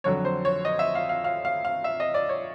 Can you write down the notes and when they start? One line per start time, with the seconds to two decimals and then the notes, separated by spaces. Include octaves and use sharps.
0.04 F2 D3 F#3 C#5
0.25 C5
0.45 C#5
0.65 D#5
0.79 E5
0.95 F5
1.09 F5
1.24 F5
1.45 F5
1.65 F5
1.84 E5
2.00 D#5
2.14 D5
2.29 C#5